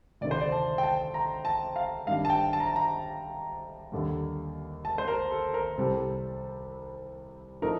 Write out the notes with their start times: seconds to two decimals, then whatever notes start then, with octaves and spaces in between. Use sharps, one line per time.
0.21 D2 C3 D#3 D5
0.31 C5
0.41 D5
0.52 A5
0.78 G5
0.83 A5
1.14 A#5
1.45 A5
1.76 F5
2.07 G2 D#3 G3 D4 F5
2.25 A5
2.30 G5
2.53 A5
2.60 A#5
2.68 A5
2.76 A#5
3.92 D#2 D3 G3
4.85 A5
4.98 C5
5.08 A#4
5.31 A4
5.54 A#4
5.77 C2 C3 G3 C4 A4
7.62 A2 F3 A3 D#4 A#4